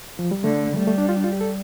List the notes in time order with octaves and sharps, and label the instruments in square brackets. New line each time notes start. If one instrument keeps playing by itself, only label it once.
[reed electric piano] F3
G3
[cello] D3 [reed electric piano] A3
[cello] G3 [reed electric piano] A3
[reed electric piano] A3
D4
F4
D4
F4
G4
A4